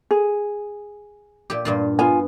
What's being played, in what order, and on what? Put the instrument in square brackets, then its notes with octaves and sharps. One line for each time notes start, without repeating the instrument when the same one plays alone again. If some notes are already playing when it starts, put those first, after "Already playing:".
[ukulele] G#4
[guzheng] A#2 G4
G2 A#2 F4
[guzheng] B3 [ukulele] F4 G#5